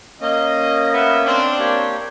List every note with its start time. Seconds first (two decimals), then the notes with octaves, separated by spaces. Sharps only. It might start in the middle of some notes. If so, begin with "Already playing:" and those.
0.21 A#3 C#4 D#5
0.93 B3 E5
1.26 C4 D4
1.59 A#3 G4 C#5